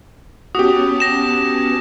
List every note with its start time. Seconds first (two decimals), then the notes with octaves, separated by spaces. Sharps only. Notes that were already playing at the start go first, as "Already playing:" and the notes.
0.55 B3 C#4 F#4 G4 A5 D#6
1.00 A#6 E7